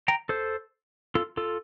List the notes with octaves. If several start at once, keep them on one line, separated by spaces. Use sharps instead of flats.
G5 A#5
A4 C5
F4 A4
F4 A4